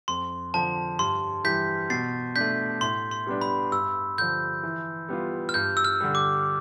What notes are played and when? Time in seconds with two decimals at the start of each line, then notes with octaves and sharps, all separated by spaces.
0.08 F2 C6
0.54 D3 F3 A5
0.99 G2 C6
1.44 E3 G3 G6 B6
1.90 B2 A6 C7
2.36 A3 D4 G6 B6
2.81 A2 C6
3.11 C6
3.27 G3 B3 D4
3.41 B5
3.72 G2 E6
4.18 D3 F3 G6
4.63 E3
5.08 G3 B3 F4
5.49 F6
5.54 G2 G6
5.77 E6
5.85 F6
6.00 D3 G3
6.15 D6